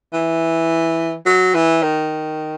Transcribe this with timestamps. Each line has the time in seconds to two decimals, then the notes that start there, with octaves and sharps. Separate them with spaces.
0.13 E3
1.26 F#3
1.54 E3
1.82 D#3